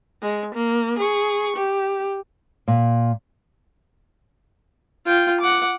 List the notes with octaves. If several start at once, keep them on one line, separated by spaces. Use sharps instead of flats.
G#3
A#3
G#4 C#6
G4
A#2
F4 G5
F#5 D6